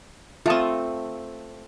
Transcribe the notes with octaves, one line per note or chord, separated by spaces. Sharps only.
A3 C4 F4 A5 D#6